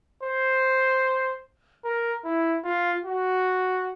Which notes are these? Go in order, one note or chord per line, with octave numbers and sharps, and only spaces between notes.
C5
A#4
E4
F4
F#4